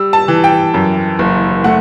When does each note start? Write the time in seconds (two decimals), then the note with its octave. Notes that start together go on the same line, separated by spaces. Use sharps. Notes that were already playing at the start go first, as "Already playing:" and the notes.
Already playing: G3 E6
0.13 A5
0.28 E3
0.44 G5
0.74 F#2
1.19 F#1
1.64 A3 F#5